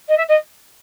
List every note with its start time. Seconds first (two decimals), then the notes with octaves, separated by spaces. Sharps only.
0.08 D#5
0.18 E5
0.28 D#5